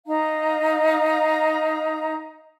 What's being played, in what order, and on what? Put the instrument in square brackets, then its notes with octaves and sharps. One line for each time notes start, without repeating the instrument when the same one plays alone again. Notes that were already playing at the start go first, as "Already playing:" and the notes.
[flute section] D#4 F5 A#5